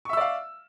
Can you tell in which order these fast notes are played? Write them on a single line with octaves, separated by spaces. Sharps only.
C#6 E5 E6 D5 F5